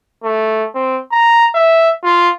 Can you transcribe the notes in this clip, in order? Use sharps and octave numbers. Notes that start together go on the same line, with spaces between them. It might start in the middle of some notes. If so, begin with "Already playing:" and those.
A3
C4
A#5
E5
F4